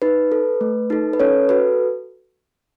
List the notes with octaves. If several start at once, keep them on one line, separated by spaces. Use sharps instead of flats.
D#4 B4
A4
A3
D#4 A4
B4
C#4 A4 C#5
F#4 A4 B4